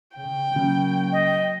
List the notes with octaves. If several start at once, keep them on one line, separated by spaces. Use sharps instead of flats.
C#3 G5
C#3 F#3 A#3
D#5